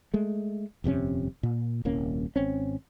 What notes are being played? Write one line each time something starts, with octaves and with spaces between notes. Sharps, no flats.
G#3 A3
D#1 F2 C3 C#4
A#2
D#1 C2 A#3 C#4
G#1 C4 C#4